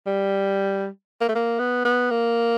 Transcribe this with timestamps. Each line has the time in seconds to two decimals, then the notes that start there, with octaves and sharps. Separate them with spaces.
0.06 G3
1.21 A#3
1.29 A3
1.35 A#3
1.59 B3
1.85 B3
2.11 A#3